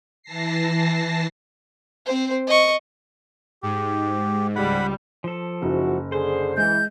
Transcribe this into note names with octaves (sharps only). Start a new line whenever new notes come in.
E3 A5 A#6 C7
C4 C5
D#5 C#6
G#2 G4
C#2 G3 F#5 B5
F3 A4
F#1 G#2 D#4 E4 F#4
D3 G#4 C5
E3 G#3 G6